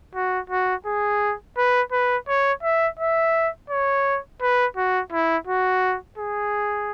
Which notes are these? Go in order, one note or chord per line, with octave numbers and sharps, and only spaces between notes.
F#4
F#4
G#4
B4
B4
C#5
E5
E5
C#5
B4
F#4
E4
F#4
G#4